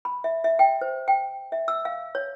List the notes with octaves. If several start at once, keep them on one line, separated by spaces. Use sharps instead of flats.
B5
E5
E5
G5
C5
G5
E5
E6
F5
C#5